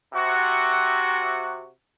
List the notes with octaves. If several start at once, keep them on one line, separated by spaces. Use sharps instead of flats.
C3 F#4